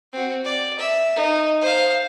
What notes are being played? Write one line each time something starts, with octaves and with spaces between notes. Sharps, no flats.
C4 F#4
D5
E5
D#4
C5 F5